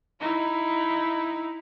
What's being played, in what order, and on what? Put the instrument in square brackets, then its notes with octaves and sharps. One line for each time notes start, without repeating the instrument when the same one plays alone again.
[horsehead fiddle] D#4 E4